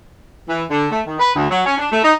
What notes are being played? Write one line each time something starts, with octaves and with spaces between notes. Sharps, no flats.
E3
D3
A3
D#3
B4
D2
F#3
C#4
D4
A3
D#4